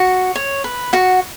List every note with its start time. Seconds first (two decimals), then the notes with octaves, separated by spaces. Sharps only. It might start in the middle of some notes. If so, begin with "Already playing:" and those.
Already playing: F#4 F#5
0.35 C#5
0.64 B4
0.93 F#4 F#5